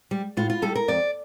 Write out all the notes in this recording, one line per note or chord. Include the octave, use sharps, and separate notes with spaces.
G3
A2 F4
F4
G3 A4
A#4
F2 D5